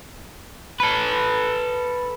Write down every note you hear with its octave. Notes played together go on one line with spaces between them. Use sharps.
A4 B4